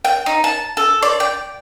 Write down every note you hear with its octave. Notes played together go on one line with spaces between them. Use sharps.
G5
D#4
A5
A4
D5
G5